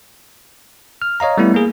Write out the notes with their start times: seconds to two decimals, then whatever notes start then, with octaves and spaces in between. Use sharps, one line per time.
1.02 F6
1.20 C#5 D#5 F5 A#5
1.37 G3 A3 B3 E4
1.54 A#3 G#4